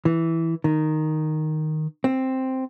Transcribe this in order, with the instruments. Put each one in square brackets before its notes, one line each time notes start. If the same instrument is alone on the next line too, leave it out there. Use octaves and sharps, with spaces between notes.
[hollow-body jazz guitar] E3
D#3
C4